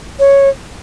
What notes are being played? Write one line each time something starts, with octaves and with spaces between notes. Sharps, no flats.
C#5